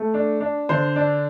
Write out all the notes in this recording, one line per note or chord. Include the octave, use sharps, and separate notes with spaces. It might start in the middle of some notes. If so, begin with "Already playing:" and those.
Already playing: A3
D4
D4
D3 C5
D4